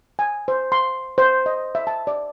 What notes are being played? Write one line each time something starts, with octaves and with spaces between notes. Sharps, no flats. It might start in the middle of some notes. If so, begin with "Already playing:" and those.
G#5
C5
C6
C5
D#5
E5
A5
D5